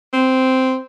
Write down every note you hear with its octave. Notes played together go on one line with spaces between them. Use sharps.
C4